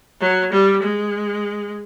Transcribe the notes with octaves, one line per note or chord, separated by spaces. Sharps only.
F#3
G3
G#3